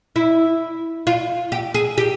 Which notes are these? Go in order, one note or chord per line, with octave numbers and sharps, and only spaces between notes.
E4
F4
G4
G#4
G4